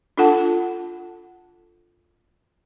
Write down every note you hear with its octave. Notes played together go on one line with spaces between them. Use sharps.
D4 F4 A4 F#5 A5